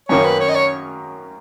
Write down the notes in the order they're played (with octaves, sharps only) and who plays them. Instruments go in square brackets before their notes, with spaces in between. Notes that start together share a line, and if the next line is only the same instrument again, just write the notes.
[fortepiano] F#2 D#3 A#3 C#4 [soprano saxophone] C#5
[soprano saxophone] B4
C#5
D#5
C#5